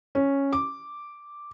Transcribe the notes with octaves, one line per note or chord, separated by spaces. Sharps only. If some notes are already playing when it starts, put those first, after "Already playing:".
C#4
D6